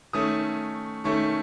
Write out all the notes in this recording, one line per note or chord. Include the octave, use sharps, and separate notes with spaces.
D#3 A3 C#4 D#6
D#3 A3 C#4 C#6